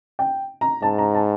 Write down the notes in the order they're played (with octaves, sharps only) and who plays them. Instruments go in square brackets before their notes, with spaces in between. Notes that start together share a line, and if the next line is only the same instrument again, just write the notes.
[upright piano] G5
A#5
[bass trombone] G#2 [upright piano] A5
[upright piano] A#5
A5